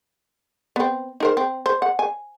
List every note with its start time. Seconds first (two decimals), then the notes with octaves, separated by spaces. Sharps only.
0.76 B3 C4
1.20 D#4 A#4 C5
1.37 C4
1.66 C5
1.82 F#5
1.99 G#5